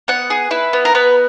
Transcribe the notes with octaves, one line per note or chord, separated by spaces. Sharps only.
B3 F#5
G#4
E4 B4
B3
A#4
B3 B4